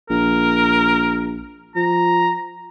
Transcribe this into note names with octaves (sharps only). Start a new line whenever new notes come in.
A#1 A#4
F3 A#5